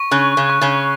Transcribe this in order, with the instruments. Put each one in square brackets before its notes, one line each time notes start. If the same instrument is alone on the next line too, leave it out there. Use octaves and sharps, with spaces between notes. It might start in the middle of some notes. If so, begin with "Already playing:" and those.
Already playing: [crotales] C#6
[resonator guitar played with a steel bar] C#3 C#4 [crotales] F#6
[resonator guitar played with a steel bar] C#3 C#4
[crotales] C#6
[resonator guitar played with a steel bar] C#3 C#4